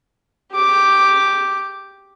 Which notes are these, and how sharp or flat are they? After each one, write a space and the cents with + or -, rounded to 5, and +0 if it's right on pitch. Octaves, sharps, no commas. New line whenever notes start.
G4 +0 D6 +0